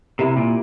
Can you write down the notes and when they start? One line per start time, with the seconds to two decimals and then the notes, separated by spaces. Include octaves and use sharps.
0.19 C3 C4 E4 G4 A#4
0.37 A#2